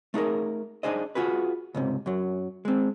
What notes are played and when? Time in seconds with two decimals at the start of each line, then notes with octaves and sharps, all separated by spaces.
0.14 A3 D#4 G#4 A#4
0.83 D4 D#4 G#4 C5 D#5
1.15 F4 F#4 G#4 B4
1.75 C#2 G#2 C3
2.06 F#2 F#3
2.65 G#3 C4